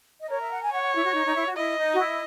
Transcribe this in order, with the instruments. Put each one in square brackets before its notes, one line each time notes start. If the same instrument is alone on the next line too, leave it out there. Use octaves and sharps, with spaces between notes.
[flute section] D#5
[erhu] A#4 [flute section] C#5
[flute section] E5
F#5
G#5
[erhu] C#5 [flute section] F#5
[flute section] F#5
E4
F#4
D#4
D#4
E4
F#4
[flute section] E4 [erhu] D#5
[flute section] D#4
F#4
E4